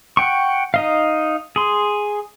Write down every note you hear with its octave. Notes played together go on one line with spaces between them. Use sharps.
F#5 G5 C#6
D#4 D#5 F5
G#4 C6